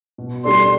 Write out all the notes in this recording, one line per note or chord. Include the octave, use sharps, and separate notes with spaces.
B2
G3 D4 A4 D5 C6